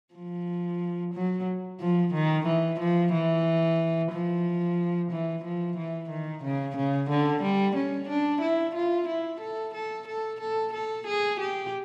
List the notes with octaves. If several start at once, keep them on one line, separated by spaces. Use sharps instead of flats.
F3
F#3
F3
D#3
E3
F3
E3
F3
E3
F3
E3
D#3
C#3
C#3
D3
G3
C#4
D4
E4
F4
E4
A4
A4
A4
A4
A4
G#4
G4